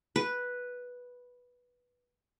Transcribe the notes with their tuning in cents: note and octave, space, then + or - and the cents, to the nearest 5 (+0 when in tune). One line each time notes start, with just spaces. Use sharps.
B4 -5